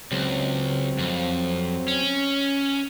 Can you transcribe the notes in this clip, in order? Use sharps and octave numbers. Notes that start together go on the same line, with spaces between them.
C#2 F#3 C4
F2
C#4